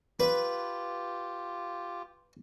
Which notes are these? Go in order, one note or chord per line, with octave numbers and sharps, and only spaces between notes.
F4 G4 B4